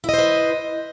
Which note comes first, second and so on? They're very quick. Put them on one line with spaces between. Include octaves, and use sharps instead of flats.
E4 D#5 C5 B4